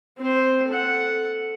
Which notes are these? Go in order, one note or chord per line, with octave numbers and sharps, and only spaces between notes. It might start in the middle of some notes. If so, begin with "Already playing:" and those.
C4 C5
A4 F#5